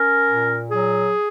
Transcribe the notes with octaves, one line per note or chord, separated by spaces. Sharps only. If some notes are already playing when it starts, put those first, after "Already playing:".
Already playing: C#4 A#4
A#2
F#3 G#4